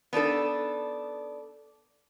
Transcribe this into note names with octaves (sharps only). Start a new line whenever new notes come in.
B3 D4 D#4 A4